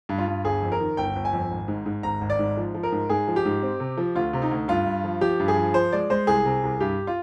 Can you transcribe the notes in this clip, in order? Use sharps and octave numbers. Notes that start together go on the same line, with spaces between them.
G2
F4
G2
G1 G#4
F2
A#4
D#3
G1 G5
G1
G#5
F2
G#1
G#2
G#2
G#1 A#5
G#1
D5
G#2
F3
F3
A#4
G#2
G#2 G#4
F3
G4
G#2
C4
C3
F3
D2 F4
C3
D#4
D2
G2 F4
G2
F3
F3 G4
G2
G#4
F3
F3 C5
G#3 D5
G#3 C5
C2 G#4
C3
C2
G2 G4
F4